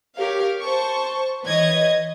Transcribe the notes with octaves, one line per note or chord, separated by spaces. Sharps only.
G4 A#4 C#5 F5
C5 A5 C#6
E3 B4 C#5 D#5 G#6